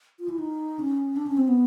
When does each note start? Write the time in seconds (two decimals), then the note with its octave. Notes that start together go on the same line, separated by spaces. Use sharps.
0.19 F4
0.29 E4
0.38 D#4
0.79 C#4
1.16 D4
1.26 C#4
1.37 C4
1.48 B3